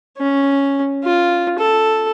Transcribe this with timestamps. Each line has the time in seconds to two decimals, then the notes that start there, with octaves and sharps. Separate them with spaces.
0.18 C#4
1.03 F4
1.58 A4